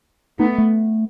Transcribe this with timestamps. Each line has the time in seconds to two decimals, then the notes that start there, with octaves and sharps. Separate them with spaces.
0.39 A3 B3 D#4
0.58 A3